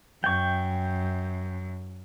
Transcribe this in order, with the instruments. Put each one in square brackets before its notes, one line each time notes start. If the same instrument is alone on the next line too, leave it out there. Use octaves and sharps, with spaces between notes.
[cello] F#2 [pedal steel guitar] G5 C#6